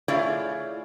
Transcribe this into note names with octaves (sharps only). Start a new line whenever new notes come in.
A3 E4 F4 G#4 C#5 D5